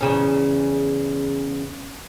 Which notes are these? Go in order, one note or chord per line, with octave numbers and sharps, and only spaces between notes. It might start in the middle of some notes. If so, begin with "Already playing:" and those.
E2 C#3 C#4